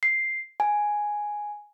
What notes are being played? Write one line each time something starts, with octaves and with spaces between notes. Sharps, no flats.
C7
G#5